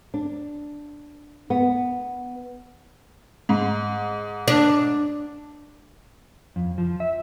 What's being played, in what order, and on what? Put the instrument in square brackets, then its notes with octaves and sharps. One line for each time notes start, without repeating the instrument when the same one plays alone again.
[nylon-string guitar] D4
B3
[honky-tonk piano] G#2
[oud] D4
[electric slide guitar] F2
F3
E5